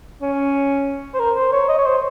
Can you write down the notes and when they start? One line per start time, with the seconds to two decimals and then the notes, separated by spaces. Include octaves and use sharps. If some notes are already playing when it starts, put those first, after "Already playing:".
0.22 C#4
1.14 C5
1.20 A#4
1.36 C5
1.52 C#5
1.69 D#5
1.78 C#5
1.86 C5